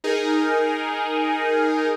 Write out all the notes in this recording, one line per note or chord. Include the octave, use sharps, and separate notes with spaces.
D#4 G#4 A#4